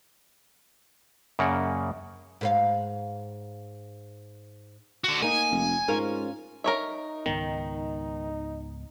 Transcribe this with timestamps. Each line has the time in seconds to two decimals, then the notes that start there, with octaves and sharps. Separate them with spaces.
1.39 F#2 C#3 A#3 D5 F#5
2.41 G#2 B4 F5
5.04 D3 F#4
5.22 A#3 D#4 G#5
5.51 F1
5.88 G#2 C#4 F4 A#4
6.64 D#4 A#4 C#5 E5
7.26 C#2 G#2 D#3 B3